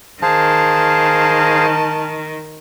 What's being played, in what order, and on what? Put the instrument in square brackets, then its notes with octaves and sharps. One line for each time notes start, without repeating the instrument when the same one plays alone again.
[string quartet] D#3 [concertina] G#4 C5 F5 [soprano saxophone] A5